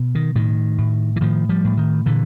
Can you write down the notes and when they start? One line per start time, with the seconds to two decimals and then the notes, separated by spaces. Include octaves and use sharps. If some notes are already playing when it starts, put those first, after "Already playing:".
Already playing: B2
0.15 D#3
0.35 A2 D#3
0.78 A2
1.16 E3
1.21 A2 D#3 F3
1.49 F3 G3
1.64 A2
1.77 D#3
2.06 A#2 D3 E3